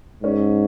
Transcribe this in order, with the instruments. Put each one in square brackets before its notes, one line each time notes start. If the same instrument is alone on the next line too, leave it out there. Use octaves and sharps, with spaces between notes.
[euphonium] G#2 [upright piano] C#4